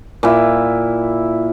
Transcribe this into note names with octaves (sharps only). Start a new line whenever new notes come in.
A#2 E4